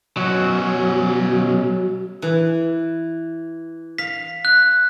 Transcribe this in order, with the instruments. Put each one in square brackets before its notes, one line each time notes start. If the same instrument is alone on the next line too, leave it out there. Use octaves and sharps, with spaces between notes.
[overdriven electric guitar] B2 C#4 [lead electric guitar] F#3
[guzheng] E3
[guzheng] F5 [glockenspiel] B6
[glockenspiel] F#6